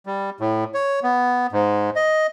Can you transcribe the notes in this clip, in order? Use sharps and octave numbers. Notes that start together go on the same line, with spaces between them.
G3
A2
C#5
B3
G#2
D#5